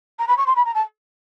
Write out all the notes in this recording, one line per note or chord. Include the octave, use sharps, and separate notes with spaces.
A#5
B5
C#6
C6
B5
A#5
A5